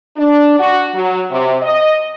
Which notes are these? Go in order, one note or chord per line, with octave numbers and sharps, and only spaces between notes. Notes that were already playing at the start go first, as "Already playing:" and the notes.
D4
F#4
F#3
C3
D#5